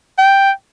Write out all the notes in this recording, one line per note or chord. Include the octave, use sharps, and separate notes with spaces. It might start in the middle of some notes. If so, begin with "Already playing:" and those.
G5